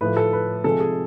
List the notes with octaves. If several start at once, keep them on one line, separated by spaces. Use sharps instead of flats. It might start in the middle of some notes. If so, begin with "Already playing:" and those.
A2 F3 A3 B4
A4
B4
C3 F3 G#3 A4
G#4